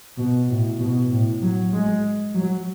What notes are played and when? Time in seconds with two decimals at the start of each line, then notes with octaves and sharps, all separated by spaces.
0.18 B2
0.49 A2
0.79 B2
1.11 A2
1.42 F#3
1.73 G#3
2.34 F#3